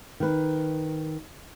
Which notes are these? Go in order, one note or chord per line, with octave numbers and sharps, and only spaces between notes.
D#3 B4